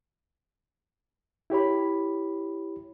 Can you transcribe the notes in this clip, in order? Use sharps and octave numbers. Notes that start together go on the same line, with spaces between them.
E4 G4 C#5 B5